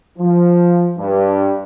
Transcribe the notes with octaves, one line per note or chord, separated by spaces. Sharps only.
F3
G2